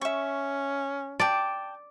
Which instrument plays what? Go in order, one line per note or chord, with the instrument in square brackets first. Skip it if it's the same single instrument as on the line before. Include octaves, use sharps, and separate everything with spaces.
[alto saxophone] C#4 [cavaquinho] E5 C#6
[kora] D5 [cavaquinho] G5 A5